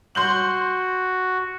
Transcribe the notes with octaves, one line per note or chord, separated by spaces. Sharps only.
F#4 C6 G6 F#7